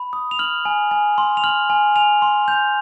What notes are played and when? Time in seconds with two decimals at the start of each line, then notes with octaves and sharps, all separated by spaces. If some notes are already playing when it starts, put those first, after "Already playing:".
Already playing: B5
0.13 D#6
0.31 F7
0.39 F6 F#7
0.65 G#5
0.91 G#5
1.18 C6
1.37 F7
1.44 F6 F#7
1.70 G#5
1.96 G#5 F7
2.22 C6
2.48 G6 F7